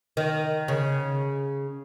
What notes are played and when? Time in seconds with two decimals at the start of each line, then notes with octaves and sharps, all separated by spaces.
0.17 D#3
0.68 C#3